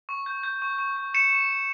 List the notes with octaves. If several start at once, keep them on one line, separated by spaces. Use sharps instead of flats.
C#6
G6
G6
C#6
C#6
C#6
C#6 C#7 E7
C#6
C#6